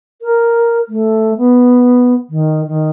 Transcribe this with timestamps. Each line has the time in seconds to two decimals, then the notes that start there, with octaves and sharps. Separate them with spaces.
0.22 A#4
0.89 A3
1.37 B3
2.30 D#3
2.68 D#3